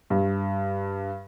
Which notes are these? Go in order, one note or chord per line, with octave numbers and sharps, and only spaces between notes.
G2